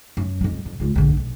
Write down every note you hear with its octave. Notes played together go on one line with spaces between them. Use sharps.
F#2
F2 G3
F2
C#2 F4
A#1 D3
B1